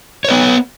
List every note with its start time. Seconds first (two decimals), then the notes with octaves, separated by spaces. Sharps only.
0.25 C#5
0.28 B4
0.31 B3